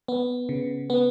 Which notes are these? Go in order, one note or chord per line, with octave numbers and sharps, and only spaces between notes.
B3
C#3
B3